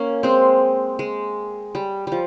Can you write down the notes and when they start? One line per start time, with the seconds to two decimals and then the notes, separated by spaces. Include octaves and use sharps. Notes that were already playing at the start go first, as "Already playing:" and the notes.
Already playing: A#3 C#4
0.23 G#3 C4
0.99 G#3
1.75 G3
2.07 F3 G3